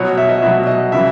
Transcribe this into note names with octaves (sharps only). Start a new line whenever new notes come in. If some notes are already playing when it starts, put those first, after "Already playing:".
Already playing: B2 F#3 C#5
E5
D#5
B2 F#3 E5
D#5
C#3 E3 E5